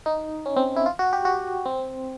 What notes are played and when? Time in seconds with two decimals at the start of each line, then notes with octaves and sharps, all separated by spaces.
0.06 D#4
0.46 C#4
0.56 C4
0.76 E4
0.86 F4
0.99 F#4
1.13 G4
1.25 F#4
1.66 C4